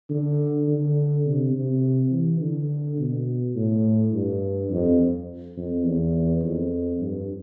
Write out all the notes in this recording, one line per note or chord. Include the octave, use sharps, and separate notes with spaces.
D3
D3
C3
C3
E3
D3
B2
A2
G2
F2
F2
E2
F2
G2